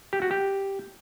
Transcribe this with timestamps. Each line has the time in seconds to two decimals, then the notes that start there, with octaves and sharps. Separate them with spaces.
0.13 G4
0.22 F#4
0.31 G4